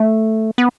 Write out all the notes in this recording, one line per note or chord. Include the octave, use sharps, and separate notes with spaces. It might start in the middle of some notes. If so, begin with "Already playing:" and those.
Already playing: A3
B3